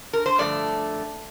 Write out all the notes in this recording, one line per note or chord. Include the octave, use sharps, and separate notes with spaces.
A#4
C5
G2 D3 F3 A3 D5